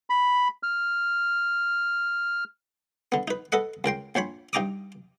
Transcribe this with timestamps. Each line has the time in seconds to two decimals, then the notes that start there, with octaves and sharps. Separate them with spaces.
0.10 B5
0.63 F6
3.12 D3 B3
3.28 D#4 B4
3.52 A4 B4 D#5 F#5
3.84 C#2 A#4 G5 C6
4.15 A#1 C5 C#5 B5
4.53 G2 D#4 G5 A#5 D6 D#6